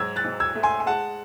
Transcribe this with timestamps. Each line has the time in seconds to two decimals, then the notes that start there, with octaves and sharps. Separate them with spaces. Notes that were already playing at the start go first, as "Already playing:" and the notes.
Already playing: G#2 F#3 E6 G#6
0.16 F#6 A6
0.24 G#2
0.40 E6 G#6
0.55 A3
0.63 G#5 C6
0.80 G#5
0.86 G#3 F#5 A5